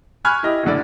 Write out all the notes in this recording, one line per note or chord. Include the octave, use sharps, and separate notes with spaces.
G#5 B5 C#6 F6 F#6 G#6
E4 G4 D#5
F#1 A2 D3 D5